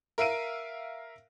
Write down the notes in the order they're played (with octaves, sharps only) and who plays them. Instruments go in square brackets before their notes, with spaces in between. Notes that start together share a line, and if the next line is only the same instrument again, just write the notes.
[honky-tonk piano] A#4 E5 F5 D7 D#7